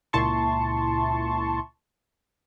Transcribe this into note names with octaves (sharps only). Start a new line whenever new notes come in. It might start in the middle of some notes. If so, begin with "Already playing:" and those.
C#2 A#2 E4 A5 C6 C#6